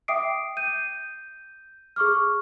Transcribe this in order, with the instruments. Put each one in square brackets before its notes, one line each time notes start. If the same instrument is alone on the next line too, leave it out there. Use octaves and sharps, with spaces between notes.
[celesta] E5 G5 D6 D#6 C7 D7
G6 D#7
G#4 C#6 D6 F6